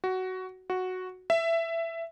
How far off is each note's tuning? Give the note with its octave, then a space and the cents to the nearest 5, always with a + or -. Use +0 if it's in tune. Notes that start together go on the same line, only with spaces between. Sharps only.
F#4 +10
F#4 -5
E5 +15